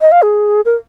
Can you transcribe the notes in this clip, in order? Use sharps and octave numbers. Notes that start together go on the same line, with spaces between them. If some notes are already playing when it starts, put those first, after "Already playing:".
D#5
F5
G#4
A#4